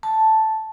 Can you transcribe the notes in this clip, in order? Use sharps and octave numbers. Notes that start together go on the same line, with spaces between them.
A5